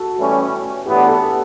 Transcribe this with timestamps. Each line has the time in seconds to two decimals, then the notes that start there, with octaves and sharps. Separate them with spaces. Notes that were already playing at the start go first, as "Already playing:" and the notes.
Already playing: F#4 A4
0.18 A2 E3 G3 C#4 G4
0.85 A2 E3 B3 D4 G4
1.08 A4